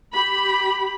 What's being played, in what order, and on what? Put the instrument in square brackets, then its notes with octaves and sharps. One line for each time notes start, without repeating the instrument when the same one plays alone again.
[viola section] G4 B5